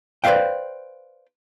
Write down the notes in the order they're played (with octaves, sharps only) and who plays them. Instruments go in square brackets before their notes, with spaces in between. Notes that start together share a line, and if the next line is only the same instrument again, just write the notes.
[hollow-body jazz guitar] B4 C5 D5 E5 F5 G5